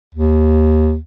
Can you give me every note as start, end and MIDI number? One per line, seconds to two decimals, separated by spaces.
0.15 0.97 39